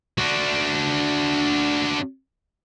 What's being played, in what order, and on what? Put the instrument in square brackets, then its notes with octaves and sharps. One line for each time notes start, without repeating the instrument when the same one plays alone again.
[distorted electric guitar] D4 F#4